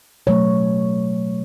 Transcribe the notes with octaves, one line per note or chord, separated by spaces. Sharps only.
B2 F#3 A3 C#5